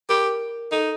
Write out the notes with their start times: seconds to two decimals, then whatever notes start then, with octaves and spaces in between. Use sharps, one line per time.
0.09 G4 A#4
0.72 D#4 A4